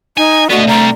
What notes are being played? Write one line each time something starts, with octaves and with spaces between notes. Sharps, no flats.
D#4 G#5
D3 A3 B3 F#4 D#5
C3 G3 A#5